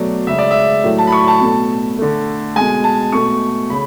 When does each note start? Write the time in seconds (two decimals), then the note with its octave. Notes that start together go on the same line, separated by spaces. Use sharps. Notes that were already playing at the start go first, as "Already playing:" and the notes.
Already playing: B2 F#3 A3 D5
0.27 C#3 G#3 E5
0.38 D5
0.51 E5
0.84 A2 F#3 A3
0.98 A5
1.07 B5
1.12 C#6
1.28 A5
1.41 B2 A3
1.98 D3 A3
2.56 B2 G#3 G#5
2.84 A5
3.12 B2 A3 C#6
3.70 C#3 B5